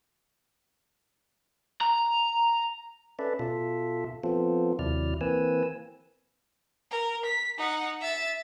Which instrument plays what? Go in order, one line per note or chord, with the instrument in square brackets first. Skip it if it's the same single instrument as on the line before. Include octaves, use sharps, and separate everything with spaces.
[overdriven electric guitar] A#5
[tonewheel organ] C#4 A4 B4 D5 E5
B2 F4 A4 E5
F3 B3 C4 F4 A4
D#2 C3 F#3 E4 D5 F6
E3 A#3 C4 B4 G#5 E6
[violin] A#4
B6
D#4 F#5
E5 A6